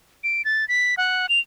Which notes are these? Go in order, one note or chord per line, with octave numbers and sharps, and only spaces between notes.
D7
A6
B6
F#5
F7